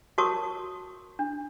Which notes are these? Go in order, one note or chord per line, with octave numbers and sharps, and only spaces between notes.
F#4 A#4 C#5 A5 C#6 D#6
D4